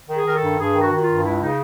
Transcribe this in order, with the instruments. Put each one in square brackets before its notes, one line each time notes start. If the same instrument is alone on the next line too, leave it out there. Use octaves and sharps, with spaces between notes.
[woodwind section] D#3
G#4
D#3 A#4
A4
G2
G2 G#4
D#3
F#4
D#3
F#4
F4
G2
C#2 E4
C#3 D#4